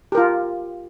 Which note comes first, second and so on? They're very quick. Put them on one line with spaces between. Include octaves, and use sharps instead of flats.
G4 A#4 F4